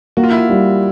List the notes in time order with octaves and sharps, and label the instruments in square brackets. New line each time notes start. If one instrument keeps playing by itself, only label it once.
[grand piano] A#3 [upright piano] F#4
[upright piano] F4
E4
F4
[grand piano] G3